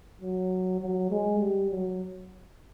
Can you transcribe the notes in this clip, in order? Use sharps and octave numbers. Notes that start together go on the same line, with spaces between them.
F#3
F#3
G#3
G3
F#3